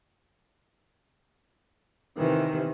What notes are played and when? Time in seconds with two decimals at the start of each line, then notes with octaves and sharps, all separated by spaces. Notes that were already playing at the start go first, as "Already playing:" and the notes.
2.16 C3 D#3 E3